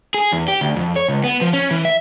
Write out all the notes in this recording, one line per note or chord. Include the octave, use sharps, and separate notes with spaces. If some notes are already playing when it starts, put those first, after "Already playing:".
G#4
E2
G4
D2
F2
C#5
C#2
B3
F3
C#4
E3
E5